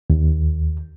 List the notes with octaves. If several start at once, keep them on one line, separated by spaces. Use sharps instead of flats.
D#2